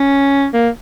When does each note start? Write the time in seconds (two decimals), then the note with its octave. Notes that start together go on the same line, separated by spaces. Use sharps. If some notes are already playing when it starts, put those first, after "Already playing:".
Already playing: C#4
0.53 A#3